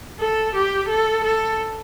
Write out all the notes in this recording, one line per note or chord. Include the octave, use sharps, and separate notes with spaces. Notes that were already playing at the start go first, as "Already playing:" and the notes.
A4
G4
A4
A4